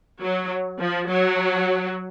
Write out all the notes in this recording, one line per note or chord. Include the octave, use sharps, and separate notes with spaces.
F#3
F3
F#3